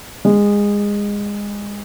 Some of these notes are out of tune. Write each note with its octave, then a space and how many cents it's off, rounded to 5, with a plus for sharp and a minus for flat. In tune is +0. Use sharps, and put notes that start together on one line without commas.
G#3 -20